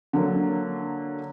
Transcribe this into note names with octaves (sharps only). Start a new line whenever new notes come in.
D3 F#3 A#3